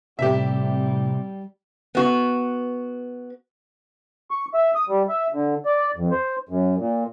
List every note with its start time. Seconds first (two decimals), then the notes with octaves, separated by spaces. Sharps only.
0.19 A2 C3 G3 G4 E5
1.95 B3 F#4
4.31 C#6
4.54 E5
4.75 D#6
4.89 G3
5.09 E5
5.33 D3
5.66 D5
5.96 F2
6.11 C5
6.49 F#2
6.79 A#2